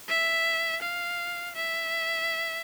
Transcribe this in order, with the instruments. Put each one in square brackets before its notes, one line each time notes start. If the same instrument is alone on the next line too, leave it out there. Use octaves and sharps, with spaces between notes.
[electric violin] E5
F5
E5